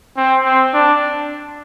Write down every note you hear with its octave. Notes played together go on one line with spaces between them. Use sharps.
C4
C4
D4